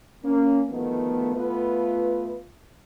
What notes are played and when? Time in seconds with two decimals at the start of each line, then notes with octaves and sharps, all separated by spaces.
0.24 A#3 C#4
0.70 D2 D#3 F3 A3 B3
1.34 A3 B3 F4 B4